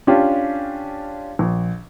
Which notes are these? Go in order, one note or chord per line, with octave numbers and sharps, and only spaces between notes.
C#4 D4 F4 G4
A#1